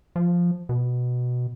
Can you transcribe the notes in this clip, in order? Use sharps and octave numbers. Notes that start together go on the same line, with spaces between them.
F3
B2